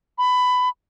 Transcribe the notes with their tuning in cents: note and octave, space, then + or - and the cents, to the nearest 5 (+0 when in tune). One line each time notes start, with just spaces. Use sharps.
B5 +15